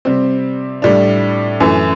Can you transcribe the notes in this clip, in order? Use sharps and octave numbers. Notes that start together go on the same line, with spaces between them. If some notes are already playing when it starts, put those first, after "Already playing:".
C3 G3 C4
A2 G3 D4
F#2 E3 A3